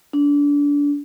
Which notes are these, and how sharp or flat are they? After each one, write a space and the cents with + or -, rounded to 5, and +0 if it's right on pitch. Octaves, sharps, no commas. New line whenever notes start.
D4 -25